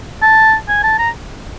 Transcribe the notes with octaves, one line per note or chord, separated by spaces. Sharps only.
A5
G#5
A5
A#5